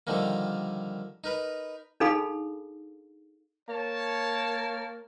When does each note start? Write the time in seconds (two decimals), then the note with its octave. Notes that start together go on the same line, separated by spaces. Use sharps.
0.07 D3 D#3 F3 G3 A#3
1.24 D#4 A#4 B4
2.00 D4 D#4 G#4 A4 F5 B5
3.69 A#3 C#5 A5